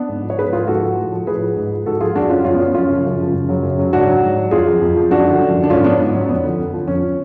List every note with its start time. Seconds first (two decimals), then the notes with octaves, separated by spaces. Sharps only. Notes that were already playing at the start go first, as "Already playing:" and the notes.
Already playing: B3 D4
0.09 G#2
0.23 F3
0.30 C#5
0.38 G#2 G#4 B4
0.53 F3 F4 G#4
0.67 G#2 F#4 A4
0.82 F3
0.97 A2
1.12 F3
1.27 A2 G#4 B4
1.41 F3
1.56 G#2
1.71 F3
1.86 G#2 F#4 A4
2.00 F3 F4 G#4
2.16 F#2 D4 F#4
2.30 F3 C#4 F4
2.45 F#2 C#4 F4
2.54 B3
2.60 F3 C#4
2.74 F#2 C#4 F4
2.89 C#3 F3
3.04 F#2
3.19 C#3 F3
3.34 F#2
3.49 C#3 F#3
3.63 F#2
3.78 C#3 F#3
3.93 G#2 D4 F#4
4.07 F#3
4.22 G#2
4.38 F#3
4.51 F2 F4 G#4
4.67 F3
4.81 F2
4.96 F3
5.10 F#2 D4 F#4
5.25 D3 F3
5.40 F#2
5.55 D3 F3
5.64 D4
5.70 G#2 C#4 F4
5.84 F#3 B3 D4
6.00 G#2
6.14 F#3 C#4
6.29 F2 B3
6.44 D3 F3
6.59 F2
6.73 D3 F3
6.88 F2 C#4
7.03 F3